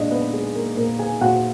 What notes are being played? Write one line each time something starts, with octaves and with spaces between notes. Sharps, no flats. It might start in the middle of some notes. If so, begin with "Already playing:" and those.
Already playing: A#2 G#3 D4 D5 D#5
B3 B4
G#3 G#4
A#3 A#4
A#2 A#3 A#4
G#4 G#5
A#2 F#4 F#5